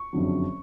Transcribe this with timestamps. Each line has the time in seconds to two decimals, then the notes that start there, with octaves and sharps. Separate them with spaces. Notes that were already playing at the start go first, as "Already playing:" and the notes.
Already playing: C#6
0.13 F#1 F2 D3 F#3